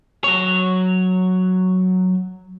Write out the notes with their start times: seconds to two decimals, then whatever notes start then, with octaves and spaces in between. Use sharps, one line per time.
0.24 F#3 C#5